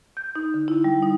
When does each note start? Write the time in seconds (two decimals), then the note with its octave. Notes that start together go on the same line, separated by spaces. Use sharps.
0.17 G6
0.36 D#4
0.54 D3
0.68 E4
0.84 G3
1.03 D#4